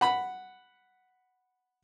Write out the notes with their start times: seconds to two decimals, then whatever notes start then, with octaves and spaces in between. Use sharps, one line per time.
0.01 F#5 B5